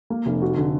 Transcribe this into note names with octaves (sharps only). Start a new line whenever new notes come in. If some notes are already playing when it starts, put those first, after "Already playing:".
A#3
F1
F#4
D3